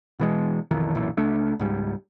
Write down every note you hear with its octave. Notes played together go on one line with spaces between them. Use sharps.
B2 E3 G#3
B1 F2 D#3 E3
B1 F#2 A#2 E3
C#2 A3 D4
C#2 G#2 G3